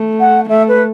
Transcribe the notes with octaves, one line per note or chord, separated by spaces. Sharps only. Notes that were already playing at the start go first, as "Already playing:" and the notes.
Already playing: A3
F#5
A3 E5
B4